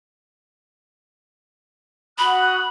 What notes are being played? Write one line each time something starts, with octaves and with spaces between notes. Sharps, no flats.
F#4 B5 D#6 F#6